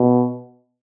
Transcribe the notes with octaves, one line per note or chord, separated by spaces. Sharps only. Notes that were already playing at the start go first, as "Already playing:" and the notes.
Already playing: B2